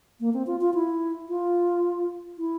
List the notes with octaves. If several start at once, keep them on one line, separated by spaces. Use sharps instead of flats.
A#3
C4
F4
F4
E4
F4
E4